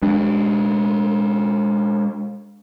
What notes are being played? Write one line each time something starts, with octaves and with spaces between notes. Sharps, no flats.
G#3 D4